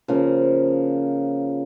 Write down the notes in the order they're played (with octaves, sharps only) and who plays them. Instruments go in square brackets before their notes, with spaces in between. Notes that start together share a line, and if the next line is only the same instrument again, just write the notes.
[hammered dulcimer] C#3 F3 A#3